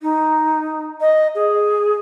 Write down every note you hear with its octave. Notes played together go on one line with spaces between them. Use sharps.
D#4
D#5
G#4